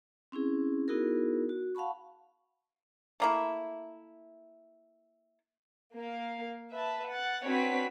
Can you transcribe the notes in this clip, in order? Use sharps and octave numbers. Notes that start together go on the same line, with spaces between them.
C4 C#4 E4 G#4
B3 D#4 E4 F#4 G#4 A#4
F#4
F5 F#5 A5 B5 C#6
A3 A#3 E4
A#3 F5
B4 E5 A5
F#5 A6
C4 D4 F#4 B4 C#5 B6